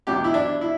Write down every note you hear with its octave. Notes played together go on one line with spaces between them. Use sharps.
E2 B2 F#3 G4
E4
D4
E4